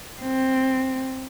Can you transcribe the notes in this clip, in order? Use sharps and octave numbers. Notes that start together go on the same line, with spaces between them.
C4